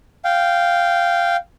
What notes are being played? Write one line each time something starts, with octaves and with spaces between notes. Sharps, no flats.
F5 G5